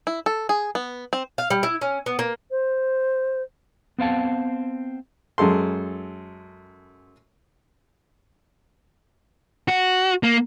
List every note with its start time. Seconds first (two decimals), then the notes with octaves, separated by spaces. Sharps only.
0.07 E4
0.26 A4
0.49 G#4
0.75 B3
1.13 C4
1.38 F5
1.50 G3
1.63 E4
1.81 C#4
2.06 B3
2.19 A#3
2.51 C5
3.98 B3 C4 F5 A5
5.38 F#2 G#3 A4 C6
9.68 F#4
10.23 A#3